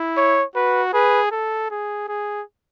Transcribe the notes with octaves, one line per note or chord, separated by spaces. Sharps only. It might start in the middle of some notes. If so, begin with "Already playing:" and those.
Already playing: E4
C#5
F#4 B4
G#4 B4
A4
G#4
G#4